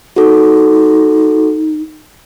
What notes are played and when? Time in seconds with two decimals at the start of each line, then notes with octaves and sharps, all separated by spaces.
0.16 D#4 F#4 A4